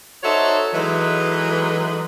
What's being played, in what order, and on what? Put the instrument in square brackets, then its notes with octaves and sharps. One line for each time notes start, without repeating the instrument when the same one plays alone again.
[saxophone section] D#4 F#4 A4 C5 C#5 E5
E3 F#3 G#3 D#4 A4 B4